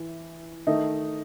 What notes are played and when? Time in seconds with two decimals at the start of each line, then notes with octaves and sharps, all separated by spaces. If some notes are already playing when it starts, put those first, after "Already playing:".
Already playing: E3
0.67 D#3 A3 D#4